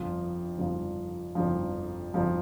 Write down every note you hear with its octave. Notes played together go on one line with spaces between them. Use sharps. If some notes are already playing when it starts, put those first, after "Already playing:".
Already playing: G1 F2 F3
G1 F2 F3
G1 F2 F3
G1 F2 F3